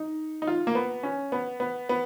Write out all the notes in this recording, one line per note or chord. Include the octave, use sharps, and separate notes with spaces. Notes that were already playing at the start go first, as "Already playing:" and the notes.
Already playing: D#4
D#4
F4
A#3
B3
C#4
B3
B3
B3